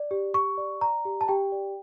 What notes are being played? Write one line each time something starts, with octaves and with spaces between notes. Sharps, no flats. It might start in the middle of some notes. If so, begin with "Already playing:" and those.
Already playing: D5
G4
G4 C#6
D5
D5 A#5
G4
A5
G4 G5
D5